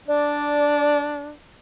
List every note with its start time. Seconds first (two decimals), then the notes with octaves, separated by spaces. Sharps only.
0.08 D4 D5